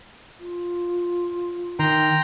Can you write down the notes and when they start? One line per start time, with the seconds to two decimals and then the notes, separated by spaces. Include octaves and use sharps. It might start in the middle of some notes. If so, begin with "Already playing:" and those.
0.40 F4
1.79 D#3 G5 A#5 C6